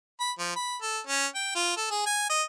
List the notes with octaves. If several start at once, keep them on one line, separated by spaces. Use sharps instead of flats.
B5
F3
B5
A4
C#4
G5
F4
A4
G#4
G#5
D#5